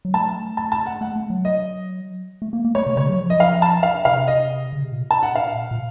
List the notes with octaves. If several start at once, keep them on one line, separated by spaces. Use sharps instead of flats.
F#3
A3 A5
A5
A5
F#5
A3 F#5
A3
F#3
D#5
A3
A#3
A#3
A3 C#5
C3
C#3 C#5
F#3
F3
D#5
F5
A5
F5
C3 F5
D#5
C#3
C3
A#2
A5
F#5
F5
A#2